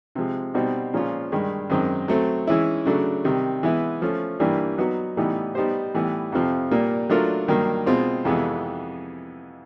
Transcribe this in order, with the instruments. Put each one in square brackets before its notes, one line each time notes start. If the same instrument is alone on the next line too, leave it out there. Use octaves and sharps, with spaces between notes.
[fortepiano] C3 F3 G#3
B2 G3 C4 D#4 F#4
A#2 F3 G#3 C#4 F4
G2 D#3 G#3
F#2 D#3 G#3 C4
F#3 A3 C4
E3 G#3 C#4 E4
C#3 F#3 A3 D4
C3 D#3 G3
E3 G#3 B3 E4
F3 A3 C#4
G2 E3 G3 A#3 D4
F#3 B3 D#4 F#4 B4
A2 E3 G3 B3 D#4
G3 B3 D#4 G4 C5
A2 E3 G3 B3
F2 C3 F3
A#2 G3 A#3
F#3 A3 D4 F4 A#4
G2 D#3 F#3 A#3
B2 G#3 C4 F4
F2 C3 E3 G#3 B3